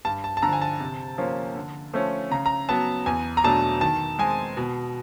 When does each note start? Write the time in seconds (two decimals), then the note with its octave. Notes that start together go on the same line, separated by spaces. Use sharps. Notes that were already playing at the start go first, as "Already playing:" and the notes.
0.05 G2 A5
0.24 A5
0.37 A5
0.42 D3 F3 A#5
0.53 G#5
0.61 A5
0.80 C3
1.18 F3 A#3 C#4
1.55 D3
1.93 F3 A3 C#4
2.31 C#3 A#5
2.46 A#5
2.69 F#3 B3 A5
3.06 E2 G#5
3.37 A#5
3.44 B2 F#3 A3 D4 A5
3.81 D#3 A5
4.19 G#3 C4 G#5
4.57 B2